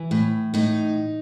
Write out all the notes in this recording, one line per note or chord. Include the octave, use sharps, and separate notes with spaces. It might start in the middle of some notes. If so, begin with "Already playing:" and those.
Already playing: E3
A2
A2 D#4